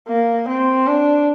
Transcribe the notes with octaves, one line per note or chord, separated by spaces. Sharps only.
A#3
C4
D4